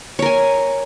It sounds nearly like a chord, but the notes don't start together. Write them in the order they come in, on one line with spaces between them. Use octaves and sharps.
C#5 A#4 G#5